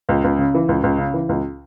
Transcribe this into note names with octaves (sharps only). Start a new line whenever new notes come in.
C#2
C#2
C#3
E3
C#2
C#2
C#3
E3
C#2